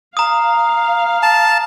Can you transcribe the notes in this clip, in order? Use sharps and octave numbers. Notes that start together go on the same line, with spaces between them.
F5 A#5 D#6
A5